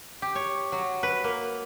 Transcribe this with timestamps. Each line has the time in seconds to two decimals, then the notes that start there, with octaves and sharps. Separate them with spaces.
0.22 G4
0.35 C#5
0.72 F#3
1.03 B4
1.24 A#3